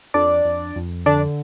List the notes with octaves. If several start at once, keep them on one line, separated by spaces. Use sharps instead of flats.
F2 D4 D5
F2
F2
D3 D4 D5